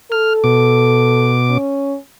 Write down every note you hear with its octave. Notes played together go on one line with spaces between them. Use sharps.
A4 F6
B2 D6
C#4